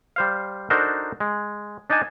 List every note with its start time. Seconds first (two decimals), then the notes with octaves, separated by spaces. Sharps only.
0.16 G3 C5 F5
0.70 D4 D#4 F#4 A4 A#4 C5
1.20 G#3
1.90 D4 D#4 D5 D#5 G#5 A5